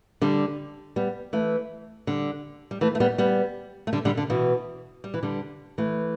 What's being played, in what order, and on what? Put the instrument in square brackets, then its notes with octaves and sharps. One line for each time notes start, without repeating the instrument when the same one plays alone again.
[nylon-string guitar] D3 G3
G3 B3
E3 A3
D3 G3
G3
E3 A3
A3
G3 B3
G3 B3
A3
D3 G3
D3 G3
D3
B2 E3
G3
E3
D3 G3
E3 A3